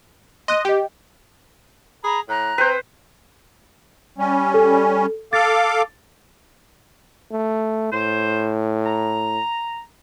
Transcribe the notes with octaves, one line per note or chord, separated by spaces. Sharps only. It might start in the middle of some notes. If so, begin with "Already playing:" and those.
D#5 C6 F#6 D#7
G4 D#5 G5
G#4 A#5 B5
A2 A#5 F#6
C4 B4 C5
G3 C#4
A4
A4 F5 D6 A6
A3
A2 C5
A#5